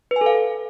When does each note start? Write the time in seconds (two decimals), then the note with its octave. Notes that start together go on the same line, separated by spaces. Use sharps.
0.11 B4
0.16 G#5
0.21 A4
0.26 F5